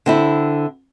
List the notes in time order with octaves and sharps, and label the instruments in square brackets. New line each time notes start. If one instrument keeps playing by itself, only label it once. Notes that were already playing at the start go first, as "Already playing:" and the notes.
[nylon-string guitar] D3 C4 E4